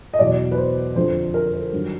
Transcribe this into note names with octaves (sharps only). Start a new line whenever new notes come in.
D#5
E2 B2 F#3 D5
B4
C5
F2 D3 F3 C5
A#4
A#4
G2 D#3 F#3